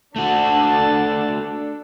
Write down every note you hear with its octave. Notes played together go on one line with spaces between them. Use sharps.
A3 D4 F#4 A4 A5